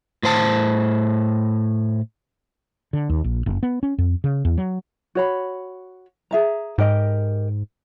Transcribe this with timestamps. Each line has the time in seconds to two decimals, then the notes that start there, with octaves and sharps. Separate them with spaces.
0.23 A2 C5 A5
2.93 D3
3.09 D#2
3.24 A#1
3.46 F#1
3.63 B3
3.83 C#4
3.98 F2
4.24 C#3
4.45 E2
4.58 F#3
5.15 F#4 C#5 B5
6.31 G#4 E5 A#5
6.78 G#2 G4 A#4 D#5